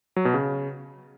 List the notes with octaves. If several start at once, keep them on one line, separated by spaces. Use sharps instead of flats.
F#3
B2
C#3